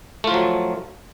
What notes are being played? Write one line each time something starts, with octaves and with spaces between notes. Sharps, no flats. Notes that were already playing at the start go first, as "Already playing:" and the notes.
F3 F#3 A3 F4